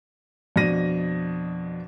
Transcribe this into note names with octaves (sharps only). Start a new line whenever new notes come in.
F2 B2 D4 A#6 D#7